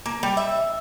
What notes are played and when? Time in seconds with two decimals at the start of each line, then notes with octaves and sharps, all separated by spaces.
0.06 A#3
0.23 G3
0.37 E5